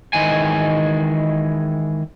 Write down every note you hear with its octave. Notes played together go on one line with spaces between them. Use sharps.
D#3 E3 G#3 G#4 G#5